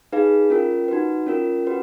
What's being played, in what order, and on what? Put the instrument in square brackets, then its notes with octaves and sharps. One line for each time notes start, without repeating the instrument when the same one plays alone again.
[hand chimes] D#4 G#4 B4 F5
C#4 F4 A#4
D#4 F#4 B4
C#4 F4 A#4
C#4 F#4 B4